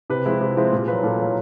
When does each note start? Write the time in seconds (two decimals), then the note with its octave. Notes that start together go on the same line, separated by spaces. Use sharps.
0.10 C3 B4
0.26 F3 G#3 C4 E4
0.41 C3
0.57 F3 G#3 C4 E4
0.72 A#2
0.88 F#3 A#3 B4
1.03 A#2 A4
1.20 F#3 A#3